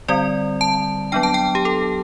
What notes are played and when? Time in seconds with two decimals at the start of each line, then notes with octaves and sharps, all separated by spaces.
0.08 D3 G3 C4 D5
0.61 A5
1.12 F#3 B3 D4 G5
1.23 A5
1.34 G5
1.55 G4
1.65 A4